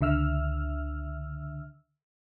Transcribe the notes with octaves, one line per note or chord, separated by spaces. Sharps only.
C#2 D3 E5 E6 F6